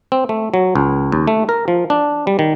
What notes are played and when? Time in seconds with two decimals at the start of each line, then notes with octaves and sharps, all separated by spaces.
0.12 C4
0.29 A3
0.54 F#3
0.75 C#2
1.12 D#2
1.27 A3
1.49 A#4
1.68 F3
1.90 D4
2.27 G3
2.39 D#3